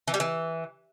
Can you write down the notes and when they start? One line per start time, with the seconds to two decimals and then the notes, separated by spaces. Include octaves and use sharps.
0.08 E3
0.14 G3
0.20 E3